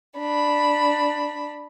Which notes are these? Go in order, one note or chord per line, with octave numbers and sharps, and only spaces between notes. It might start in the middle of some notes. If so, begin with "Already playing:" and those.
D4 B5